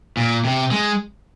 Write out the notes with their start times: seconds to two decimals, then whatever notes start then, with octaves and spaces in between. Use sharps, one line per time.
0.17 A#2
0.45 C3
0.71 G#3